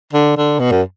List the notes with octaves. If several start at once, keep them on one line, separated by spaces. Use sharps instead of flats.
D3
D3
B2
F#2